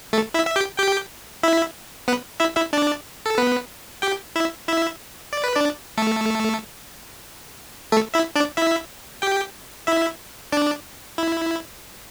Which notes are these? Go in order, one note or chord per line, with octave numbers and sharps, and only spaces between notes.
A3 A4
E4 E5
E5
G4 G5
G4 G5
E4 E5
B3 B4
E4 E5
E4 E5
D4 D5
A4
B3 B4
G4 G5
E4 E5
E4 E5
D5
B4
D4 D5
A3 A4
A3 A4
E4 E5
D4 D5
E4 E5
G4 G5
E4 E5
D4 D5
E4